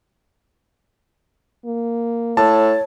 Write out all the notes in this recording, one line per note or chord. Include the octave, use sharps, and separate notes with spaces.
A#3
A2 C#5 A5